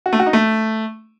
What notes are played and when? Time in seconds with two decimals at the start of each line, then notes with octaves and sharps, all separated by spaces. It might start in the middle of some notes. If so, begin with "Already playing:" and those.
0.06 F#4
0.13 A3
0.19 F#4
0.26 D#4
0.33 A3